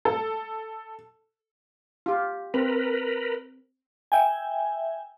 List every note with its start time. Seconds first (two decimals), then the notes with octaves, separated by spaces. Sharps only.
0.05 A4
2.06 F4 G4
2.54 C4 A#4 B4
4.12 E5 G5 G#5